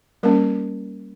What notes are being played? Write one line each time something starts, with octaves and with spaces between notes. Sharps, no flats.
G3 A#3 C#4 A#4